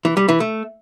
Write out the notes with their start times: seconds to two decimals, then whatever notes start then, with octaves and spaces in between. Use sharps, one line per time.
0.05 E3
0.17 G3
0.29 E3
0.40 A3